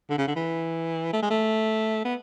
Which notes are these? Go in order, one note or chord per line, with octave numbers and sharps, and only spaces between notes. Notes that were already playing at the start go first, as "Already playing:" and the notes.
D3
C#3
D3
E3
A3
G#3
A3
B3